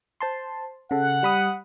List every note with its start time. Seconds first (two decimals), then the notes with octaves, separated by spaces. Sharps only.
0.20 C5 A5 C6
0.91 C#3 A4 F#5
1.23 G3 B5 D#6